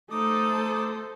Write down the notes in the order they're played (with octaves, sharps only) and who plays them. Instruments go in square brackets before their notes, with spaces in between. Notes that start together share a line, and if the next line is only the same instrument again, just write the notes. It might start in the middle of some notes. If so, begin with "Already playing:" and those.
[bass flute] A3 [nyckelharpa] D#4 [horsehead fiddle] A4 C5 [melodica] D6 D#6